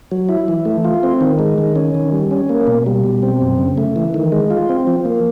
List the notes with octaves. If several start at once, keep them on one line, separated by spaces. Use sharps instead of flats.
F#3
E4
E3
A3
F4
C4
D#3
G#3
D#3
C#4
D#3
G3
C#4
A#3
B2
G3
B2
C4
F#2
C#3
A3
E3
D#3
G#3
F4
C4
F3
A#3